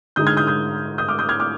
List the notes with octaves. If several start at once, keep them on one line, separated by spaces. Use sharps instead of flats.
D3 G#3 D#4 D#6 G6
F6 G#6
D#6 G6
D#6 G6
D#6 G6
D6 F6
D#6 G6
F6 G#6
D6 F6